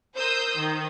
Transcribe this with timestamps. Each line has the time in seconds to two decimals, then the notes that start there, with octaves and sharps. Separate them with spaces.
0.16 A#4 C5 D#6 E6 G6
0.55 D#3